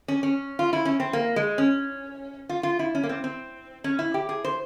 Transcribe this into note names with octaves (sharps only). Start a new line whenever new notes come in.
C#4
C#4
F4
E4
C#4
C4
A#3
G#3
C#4
F4
F4
E4
C#4
A#3
C4
C4
C#4
E4
G4
G#4
C5